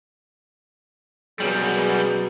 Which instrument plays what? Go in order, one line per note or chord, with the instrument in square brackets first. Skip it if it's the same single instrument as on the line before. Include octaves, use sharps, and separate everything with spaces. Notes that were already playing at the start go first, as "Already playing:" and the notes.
[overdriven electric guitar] F#2 G3 [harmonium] B2 F#3 B3 [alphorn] G#4